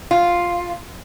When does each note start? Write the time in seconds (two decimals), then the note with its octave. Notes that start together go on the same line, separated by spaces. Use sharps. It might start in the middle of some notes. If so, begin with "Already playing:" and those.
0.11 F4